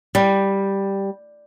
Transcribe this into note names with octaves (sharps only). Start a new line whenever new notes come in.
G3